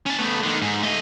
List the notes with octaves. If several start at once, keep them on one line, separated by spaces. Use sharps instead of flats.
C#4 A5
A3 B3
D3 D#3
G#2
A3 D#5